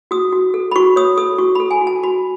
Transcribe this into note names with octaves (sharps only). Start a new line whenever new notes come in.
F#4 D#6
F#4
A4
B5
F#4 C#6
C#5 D#6
A4 D#6
F#4 C#6
A4 B5
G#5
F#4
A5
F#4 B5